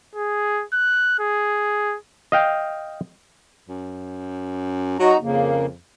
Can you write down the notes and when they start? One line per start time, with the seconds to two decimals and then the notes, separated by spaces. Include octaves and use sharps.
0.15 G#4
0.73 F#6
1.19 G#4
2.32 D#5 F5 G5
3.69 F#2
5.00 F#3 D#4 F#4 A#5
5.21 F2 C#3 A#3